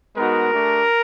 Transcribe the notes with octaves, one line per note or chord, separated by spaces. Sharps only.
G#3 B3 D#4 F#4 A#4
A3 D4 G4